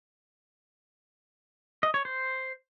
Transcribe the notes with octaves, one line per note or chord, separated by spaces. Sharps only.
D#5
C#5
C5